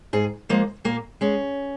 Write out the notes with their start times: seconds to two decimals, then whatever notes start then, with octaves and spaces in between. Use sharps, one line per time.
0.13 G#2 G#4
0.49 F3 G#3 A#3
0.84 A#2 A#3
1.21 G#3 C#4